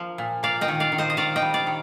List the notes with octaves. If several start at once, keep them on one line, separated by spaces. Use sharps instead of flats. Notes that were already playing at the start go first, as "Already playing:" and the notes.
Already playing: F3 A#3
A#2
A#3 D5 F5
D#5 G5
D#3
D5 F5
D#3
C5 D#5
D#5
D#3 D5 F5
D#5 G5
G3
D5 F5
D#3